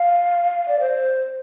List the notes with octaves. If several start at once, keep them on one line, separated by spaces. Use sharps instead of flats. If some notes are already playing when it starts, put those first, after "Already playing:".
Already playing: F5
D5
C5